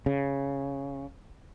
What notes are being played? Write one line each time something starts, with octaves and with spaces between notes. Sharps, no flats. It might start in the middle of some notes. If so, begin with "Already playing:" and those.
C#3